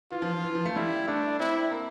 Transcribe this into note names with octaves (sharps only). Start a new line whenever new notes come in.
E3 F4
F3
F3
E3
F3
A3
G3 E4
A3 D4
C4 E4
A#3